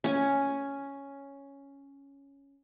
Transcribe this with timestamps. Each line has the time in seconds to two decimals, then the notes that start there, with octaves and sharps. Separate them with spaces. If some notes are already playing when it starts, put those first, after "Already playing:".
0.04 C#4 G#5